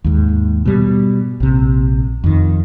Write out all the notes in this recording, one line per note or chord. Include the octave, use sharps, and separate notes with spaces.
D#2 G#2
B2 G3
A#1 C3
F2 D#3